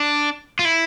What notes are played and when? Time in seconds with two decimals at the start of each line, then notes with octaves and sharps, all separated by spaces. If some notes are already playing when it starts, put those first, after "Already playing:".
Already playing: D4
0.59 F4
0.65 E4